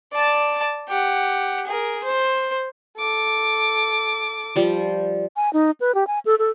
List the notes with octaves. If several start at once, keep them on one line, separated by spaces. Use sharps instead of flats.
D5 A5
G4 F#5
G#4 A#4
C5
A4 D6
F3 G3
G#5
D#4
B4
G4
G#5
A4
A4